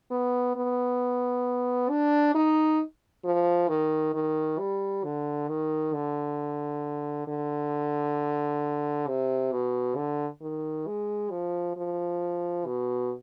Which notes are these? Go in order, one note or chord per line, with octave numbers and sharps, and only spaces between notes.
B3
B3
D4
D#4
F3
D#3
D#3
G3
D3
D#3
D3
D3
C3
B2
D3
D#3
G#3
F3
F3
B2